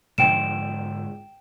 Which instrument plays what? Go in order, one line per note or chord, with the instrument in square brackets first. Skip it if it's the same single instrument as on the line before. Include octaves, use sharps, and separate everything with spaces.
[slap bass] G#2 D3 F3 [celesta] G5 D7 E7